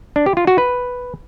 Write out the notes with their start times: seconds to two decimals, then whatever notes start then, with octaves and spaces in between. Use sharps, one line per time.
0.16 D4
0.26 G4
0.37 F4
0.47 F#4
0.58 B4